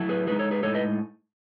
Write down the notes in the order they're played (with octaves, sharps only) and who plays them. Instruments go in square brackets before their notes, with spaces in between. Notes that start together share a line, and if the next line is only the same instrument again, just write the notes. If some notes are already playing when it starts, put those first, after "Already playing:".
Already playing: [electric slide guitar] F#3 A3 E4
G#4 B4
A2 G#3 D#4 G#4 B4
A4 C#5
G#4 B4
A2 G#3 D#4 A4 C#5
B4 D#5